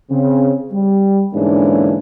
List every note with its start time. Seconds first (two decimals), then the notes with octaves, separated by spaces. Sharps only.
0.11 C#3 C4
0.72 G3
1.34 G#2 D3 E3 A#3 C#4 D4